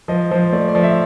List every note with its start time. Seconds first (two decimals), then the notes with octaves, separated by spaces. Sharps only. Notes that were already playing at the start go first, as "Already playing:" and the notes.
0.08 F3 D#5
0.31 F3 C5
0.53 A3 D5
0.68 D5
0.75 F3
0.83 E5